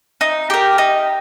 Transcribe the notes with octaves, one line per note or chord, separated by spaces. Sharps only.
D#4
G4 A#4
D#4